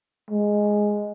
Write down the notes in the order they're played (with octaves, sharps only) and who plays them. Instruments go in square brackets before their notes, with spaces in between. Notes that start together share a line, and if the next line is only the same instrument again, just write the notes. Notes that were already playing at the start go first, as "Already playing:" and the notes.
[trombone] G#3